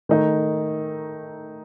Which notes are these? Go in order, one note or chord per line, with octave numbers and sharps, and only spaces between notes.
D#3 A3 D#4